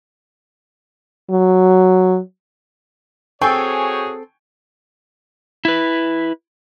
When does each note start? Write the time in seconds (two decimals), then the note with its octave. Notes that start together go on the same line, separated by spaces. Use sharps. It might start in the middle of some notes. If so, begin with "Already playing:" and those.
1.31 F#3
3.41 C4 F#4 G#4 A4 C#5 G5 G#5 C#6
5.65 E4 B4